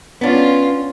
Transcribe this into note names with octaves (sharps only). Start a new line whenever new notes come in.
B3 C#4 D4 F4